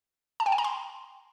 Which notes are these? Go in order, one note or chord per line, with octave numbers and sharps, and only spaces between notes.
A5
G5
G#5
A#5
C6